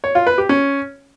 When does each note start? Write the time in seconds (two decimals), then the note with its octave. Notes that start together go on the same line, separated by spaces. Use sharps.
0.04 C#5
0.15 F4
0.27 B4
0.38 G4
0.49 C#4